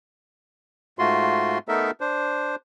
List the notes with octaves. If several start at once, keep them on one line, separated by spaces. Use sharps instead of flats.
G#2 A3 F4 F#4 C6
A3 B3 D#4 A4 A#4 E5
D4 C5